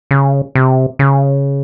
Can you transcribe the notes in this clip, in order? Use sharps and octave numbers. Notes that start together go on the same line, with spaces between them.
C#3
C3
C#3